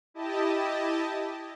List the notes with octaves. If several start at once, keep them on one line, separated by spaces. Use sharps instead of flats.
E4 G4 D#5 A5